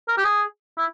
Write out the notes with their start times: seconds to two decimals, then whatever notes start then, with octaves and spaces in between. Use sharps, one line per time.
0.09 A#4
0.18 G4
0.24 G#4
0.78 E4